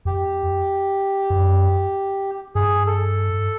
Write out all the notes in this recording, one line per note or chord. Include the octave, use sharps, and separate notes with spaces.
F2 G4
F#2
G2 G#4
A4